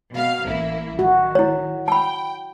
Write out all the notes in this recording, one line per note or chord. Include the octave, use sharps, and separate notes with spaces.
B2 F5
A1 A#3 E4
D#3 F#4
E4 C#5
G5 A5 B5